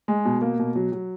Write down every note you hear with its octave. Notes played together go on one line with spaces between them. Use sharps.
G#3
B2
A#3
B2
F#3
F#3